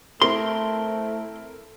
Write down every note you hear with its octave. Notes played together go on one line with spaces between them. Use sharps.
A3 C4 E4 A#4 C6